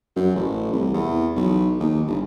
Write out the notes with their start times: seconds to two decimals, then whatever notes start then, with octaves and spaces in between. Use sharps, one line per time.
0.16 F#2
0.36 A1
0.72 C2
0.94 E2
1.36 B1
1.80 D#2
2.06 G1